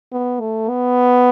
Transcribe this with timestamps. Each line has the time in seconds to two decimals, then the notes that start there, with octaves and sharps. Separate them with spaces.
0.12 B3
0.40 A3
0.69 B3